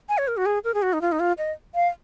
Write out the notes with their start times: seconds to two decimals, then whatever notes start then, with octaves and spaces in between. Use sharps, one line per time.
0.09 G#5
0.18 C#5
0.28 A#4
0.37 F#4
0.46 G#4
0.64 A#4
0.74 G#4
0.82 F#4
0.93 D#4
1.01 F4
1.12 D#4
1.20 F4
1.38 D#5
1.75 F5